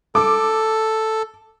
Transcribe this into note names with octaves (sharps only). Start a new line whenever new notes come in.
A4 D6